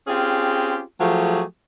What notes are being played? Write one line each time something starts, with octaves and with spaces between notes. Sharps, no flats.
C4 C#4 F4 G4 G#4
F3 F#3 A3 G4 G#4